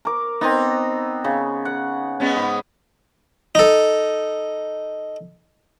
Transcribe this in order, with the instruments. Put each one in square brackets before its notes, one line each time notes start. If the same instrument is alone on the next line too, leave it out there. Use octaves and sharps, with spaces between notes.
[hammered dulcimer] A#4 D6
[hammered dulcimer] B3 C4 [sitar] D#4
[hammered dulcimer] C#3
F#5
[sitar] G#3 B3 C#4
[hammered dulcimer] G#2
[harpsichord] D#4 A4